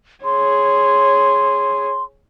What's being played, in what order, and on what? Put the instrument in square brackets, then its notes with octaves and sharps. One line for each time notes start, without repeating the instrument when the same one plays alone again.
[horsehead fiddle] G#4 C#5 [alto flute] C6